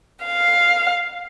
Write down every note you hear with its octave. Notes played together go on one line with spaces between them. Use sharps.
F5